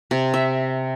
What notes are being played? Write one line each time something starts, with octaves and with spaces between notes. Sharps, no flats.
C3
E5